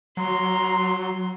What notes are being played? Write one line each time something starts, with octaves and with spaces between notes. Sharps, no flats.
F#3 A#5 C6